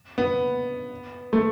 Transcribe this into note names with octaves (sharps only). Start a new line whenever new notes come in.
B3
A3